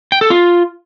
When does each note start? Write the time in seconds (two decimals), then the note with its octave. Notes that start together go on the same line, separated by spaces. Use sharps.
0.12 G5
0.21 A4
0.30 F4